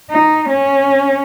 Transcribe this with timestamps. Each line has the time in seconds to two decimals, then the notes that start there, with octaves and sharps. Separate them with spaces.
0.10 D#4
0.50 C#4